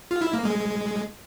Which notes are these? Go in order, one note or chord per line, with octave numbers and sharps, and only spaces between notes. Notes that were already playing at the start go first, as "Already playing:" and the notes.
F4
E4
A#3
G#3